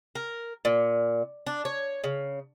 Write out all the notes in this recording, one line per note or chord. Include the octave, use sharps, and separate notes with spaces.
A#4
A#2
D4
C#5
C#3